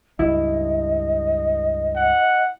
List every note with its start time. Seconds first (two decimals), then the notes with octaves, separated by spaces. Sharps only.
0.19 C#2 G2 E4 D#5
1.96 F#5